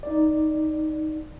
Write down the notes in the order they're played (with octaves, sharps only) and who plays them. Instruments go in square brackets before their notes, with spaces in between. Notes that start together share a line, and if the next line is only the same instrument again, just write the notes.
[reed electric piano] D#4 D5